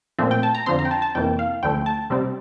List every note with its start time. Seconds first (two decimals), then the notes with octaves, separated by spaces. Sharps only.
0.19 A#2 F3 A3 C4 E5
0.31 G5
0.43 A5
0.55 A#5
0.66 F2 D3 F3 C4 C6
0.79 A#5
0.85 G5
0.91 A5
1.02 A5
1.15 F2 C3 E3 A#3 G5
1.39 F5
1.63 D2 D3 F3 A3 G5
1.86 A5
2.10 C3 G3 C4